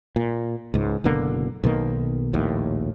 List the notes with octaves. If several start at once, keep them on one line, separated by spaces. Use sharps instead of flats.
A#2
C#2 G#2
F#1 B2 D3 A#3
B1 B2 D#3 A#3
A#1 D#2 A2